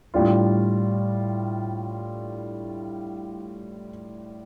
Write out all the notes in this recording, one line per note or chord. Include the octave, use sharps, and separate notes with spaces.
A2 G3 D4 F4